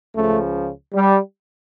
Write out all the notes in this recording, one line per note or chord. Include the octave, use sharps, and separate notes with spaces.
C#2 C#3 F3 A3
G3